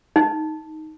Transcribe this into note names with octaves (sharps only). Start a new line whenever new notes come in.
D#4